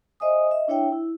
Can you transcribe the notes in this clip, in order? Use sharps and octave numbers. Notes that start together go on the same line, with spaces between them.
C5 D#5 E5 G#5 D#6
D#5 E5
D4 E4 C#5 E5 G5
E4